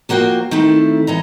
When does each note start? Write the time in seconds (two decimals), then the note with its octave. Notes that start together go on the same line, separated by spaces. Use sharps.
0.09 F3 A#3 F#4 C5 G5
0.51 D#3 A3 C4 E4 A4
1.07 E3 D#5 A#5